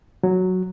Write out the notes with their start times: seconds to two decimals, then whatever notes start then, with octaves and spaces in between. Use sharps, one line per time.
0.23 F#3